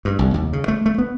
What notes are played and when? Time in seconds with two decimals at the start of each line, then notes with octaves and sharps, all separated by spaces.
0.05 G2
0.19 C2
0.34 D#2
0.53 C#3
0.68 A3
0.86 A3
0.98 B3